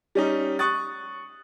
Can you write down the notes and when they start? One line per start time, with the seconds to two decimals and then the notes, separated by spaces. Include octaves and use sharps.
0.15 G3 C#4 D#4
0.59 C#6 D#6 F#6 A6